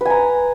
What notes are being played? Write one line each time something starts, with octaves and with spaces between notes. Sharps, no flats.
B4 G#5 A#5